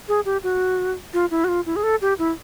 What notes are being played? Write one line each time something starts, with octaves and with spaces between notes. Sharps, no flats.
G#4
G4
F#4
F4
E4
F#4
F4
E4
G#4
A4
G4
E4